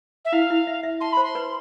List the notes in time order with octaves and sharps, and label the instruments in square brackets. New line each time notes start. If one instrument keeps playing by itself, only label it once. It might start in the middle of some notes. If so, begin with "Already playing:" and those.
[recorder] E5
[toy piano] E4 [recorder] F5
[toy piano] E4
E5
E5
[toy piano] A5 [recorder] C6
[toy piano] C5 [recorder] B5
[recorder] C6
[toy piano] B4